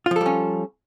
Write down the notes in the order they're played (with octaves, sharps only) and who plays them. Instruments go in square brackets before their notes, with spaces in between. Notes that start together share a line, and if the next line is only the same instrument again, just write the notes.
[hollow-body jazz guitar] F4
F3
A4
G3
C#4